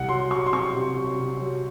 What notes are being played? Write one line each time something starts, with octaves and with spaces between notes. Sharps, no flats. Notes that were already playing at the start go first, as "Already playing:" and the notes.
Already playing: C2 F#5
F#3 C6
F#3 C#6
C6
C4 C#6
C3
F#3
C3
F#3